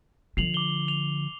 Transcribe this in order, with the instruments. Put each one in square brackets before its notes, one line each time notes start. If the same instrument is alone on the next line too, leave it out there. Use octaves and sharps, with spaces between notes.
[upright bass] D3 F3 [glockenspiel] C7 F7 F#7
[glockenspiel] D6 G7
F7